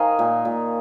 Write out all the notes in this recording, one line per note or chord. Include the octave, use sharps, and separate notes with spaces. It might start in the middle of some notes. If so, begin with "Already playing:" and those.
Already playing: D#3 D#5 F5 G#5
A#2
A#2